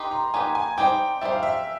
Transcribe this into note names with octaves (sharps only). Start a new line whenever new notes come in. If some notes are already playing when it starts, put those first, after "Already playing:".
Already playing: D#4 G4 B4 C6
A#5
A#3 D#4 G4 B4 G#5
G#5
G3 C4 D#4 G4 C5 G5
G3 C4 D#4 G4 C5 E5
F5
E5